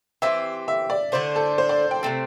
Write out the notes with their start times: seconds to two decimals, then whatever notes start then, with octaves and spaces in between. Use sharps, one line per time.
0.22 E3 C4 G4 E5
0.68 E5
0.90 D5
1.12 D3 A3 D4 C5
1.36 A4
1.58 C5
1.69 D5
1.91 G5
2.03 C3 A3 C4